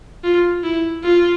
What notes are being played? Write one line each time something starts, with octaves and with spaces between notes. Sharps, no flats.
F4
E4
F4